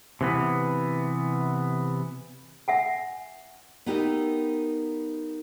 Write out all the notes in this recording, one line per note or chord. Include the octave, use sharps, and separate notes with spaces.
C3 E3 B3
E5 F#5 G#5
B3 D#4 G4 A#4 E5